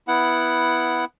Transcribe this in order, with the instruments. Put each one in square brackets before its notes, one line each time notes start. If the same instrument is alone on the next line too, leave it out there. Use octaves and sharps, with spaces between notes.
[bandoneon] B3 E4 F#5